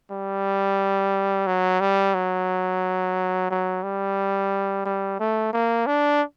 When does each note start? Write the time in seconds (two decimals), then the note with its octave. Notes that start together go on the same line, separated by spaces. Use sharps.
0.11 G3
1.47 F#3
1.80 G3
2.15 F#3
3.50 F#3
3.83 G3
4.86 G3
5.20 A3
5.53 A#3
5.87 D4